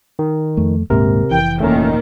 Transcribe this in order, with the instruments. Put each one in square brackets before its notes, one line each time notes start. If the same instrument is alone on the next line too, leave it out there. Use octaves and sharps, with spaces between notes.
[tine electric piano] D#3
[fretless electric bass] F2 A3
[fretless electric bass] D#1 G#2 A#3 [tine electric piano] C3 A#4
[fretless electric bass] F1 E3 [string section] G5
[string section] D#2 A#2 D#3 [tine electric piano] A3 C#4 A#4